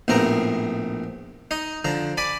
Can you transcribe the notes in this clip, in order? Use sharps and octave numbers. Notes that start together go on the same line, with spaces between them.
A#1 A2 B3 C4 A#4 A#5
D#4 D#5
D3 F3 A#5
D5 G#5 B5 D6